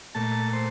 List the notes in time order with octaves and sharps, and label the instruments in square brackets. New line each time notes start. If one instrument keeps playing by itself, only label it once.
[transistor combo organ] A#2 A3 A5
C5